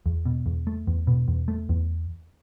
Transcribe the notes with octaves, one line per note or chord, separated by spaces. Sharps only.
E2
B2
E2
A3
E2
B2
E2
A3
E2